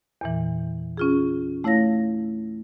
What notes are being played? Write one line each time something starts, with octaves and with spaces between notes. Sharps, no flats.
E2 A#2 E3
C#4 F4 G#4
A3 E4 C#5 F5 A#6